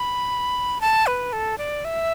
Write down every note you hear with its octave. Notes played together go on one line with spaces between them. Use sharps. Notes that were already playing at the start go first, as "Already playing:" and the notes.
Already playing: B5
A5
B4
A4
D5
E5